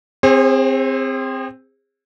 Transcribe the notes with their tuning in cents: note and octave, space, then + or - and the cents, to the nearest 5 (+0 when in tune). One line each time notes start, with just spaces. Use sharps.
C4 +0 G#4 -30 C5 +45